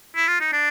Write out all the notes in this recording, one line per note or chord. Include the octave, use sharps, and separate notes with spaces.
E4
F4
D#4
D4